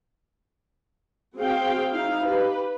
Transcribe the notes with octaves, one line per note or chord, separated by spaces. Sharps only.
C4 F#4 G#4 F5 G5
D#4 E4 F5
G4 B4